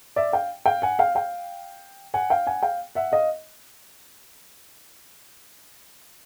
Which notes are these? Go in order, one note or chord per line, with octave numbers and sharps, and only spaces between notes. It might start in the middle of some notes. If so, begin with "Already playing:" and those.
D5 E5
F5 G5
F5 G5
F#5 G#5
F5 G5
F5 G5
F#5 G#5
F5 G5
F#5 G#5
F5 G5
E5 F#5
D#5 F5